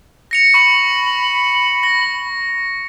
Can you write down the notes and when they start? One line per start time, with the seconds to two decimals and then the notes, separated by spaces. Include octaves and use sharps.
0.31 A#6 C#7 F7
0.54 B5 C#6
1.83 A#6